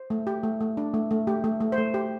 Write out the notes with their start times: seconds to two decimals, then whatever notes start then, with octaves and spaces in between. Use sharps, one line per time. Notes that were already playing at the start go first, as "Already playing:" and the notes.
Already playing: C5
0.10 A3
0.27 G4
0.43 A3
0.61 A3
0.77 D4
0.94 A3
1.11 A3
1.27 A3 G4
1.44 A3
1.60 A3
1.72 C5
1.78 A3
1.94 G4